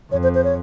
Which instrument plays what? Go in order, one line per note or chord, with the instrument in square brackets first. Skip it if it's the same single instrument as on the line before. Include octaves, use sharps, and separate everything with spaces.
[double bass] F2 [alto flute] C#5
[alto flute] C5
C5
C#5